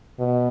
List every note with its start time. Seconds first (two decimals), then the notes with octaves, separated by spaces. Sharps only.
0.19 B2